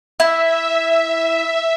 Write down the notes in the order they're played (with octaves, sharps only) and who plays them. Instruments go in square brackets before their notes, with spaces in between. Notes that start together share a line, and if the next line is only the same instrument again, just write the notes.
[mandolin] E4 [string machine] E5